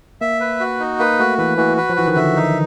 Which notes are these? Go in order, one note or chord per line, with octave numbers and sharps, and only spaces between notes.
A#3 E5
B4
F#4
D#4
A#3 B4
A3 F#4
E3 B4
E3 F#4
B4
F3
E3 F#4
D#3
D3 E5
D#4